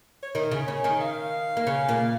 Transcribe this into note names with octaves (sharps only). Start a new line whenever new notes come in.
C#5
D#3 D#4 A#4
C#3 C#4
C#3 C#4 C#5
D#3 D#4
F5
A#3
C#3 C#4
A#2 A#3